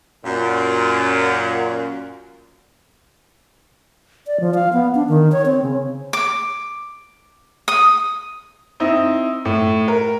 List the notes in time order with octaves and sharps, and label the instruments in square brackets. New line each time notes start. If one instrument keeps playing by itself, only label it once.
[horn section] F#2 A#2
[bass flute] D5
F3
F5
B3
D4
D#3
C#5
C4
C#3
[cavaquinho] D6
D#6
[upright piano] C4 D#4 E4
A2
A#4